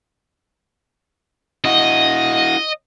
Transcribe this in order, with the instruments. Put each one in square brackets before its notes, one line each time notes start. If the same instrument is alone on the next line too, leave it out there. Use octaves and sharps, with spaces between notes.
[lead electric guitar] E4 F#4 [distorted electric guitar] D#5